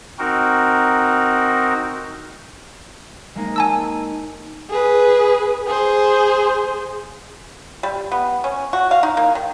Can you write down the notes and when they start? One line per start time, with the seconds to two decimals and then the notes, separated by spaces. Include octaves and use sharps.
0.19 C4 D#4 F#4 A#4
3.35 G#3 A#3 D#4
3.56 G#5 A5 E6
4.69 G#4 B4
5.67 G#4 C5
7.83 G3
8.12 B3
8.44 C#4
8.73 F#4
8.91 F5
9.03 D#4
9.17 A#3
9.35 D#3